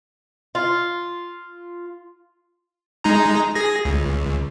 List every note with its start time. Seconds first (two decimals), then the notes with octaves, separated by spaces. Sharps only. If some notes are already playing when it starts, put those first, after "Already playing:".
0.55 F4
3.04 G#3 D#4 A#5
3.55 G#4 A#6
3.85 C#2